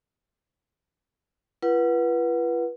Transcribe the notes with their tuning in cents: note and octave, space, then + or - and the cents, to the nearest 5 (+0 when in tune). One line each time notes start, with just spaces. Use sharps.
F4 -40 B4 -25 F#5 +0